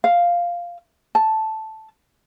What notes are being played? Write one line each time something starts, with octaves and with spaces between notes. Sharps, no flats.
F5
A5